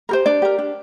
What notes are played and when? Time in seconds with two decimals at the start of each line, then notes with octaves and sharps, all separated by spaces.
0.09 G4 A#4 C5
0.26 D4 D5
0.42 G4 A#4
0.58 D4